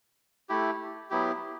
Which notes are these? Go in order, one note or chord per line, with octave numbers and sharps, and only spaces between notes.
A3 E4 G4
F#3 B3 E4 G4